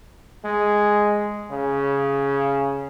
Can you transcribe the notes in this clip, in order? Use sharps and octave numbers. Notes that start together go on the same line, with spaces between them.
G#3
C#3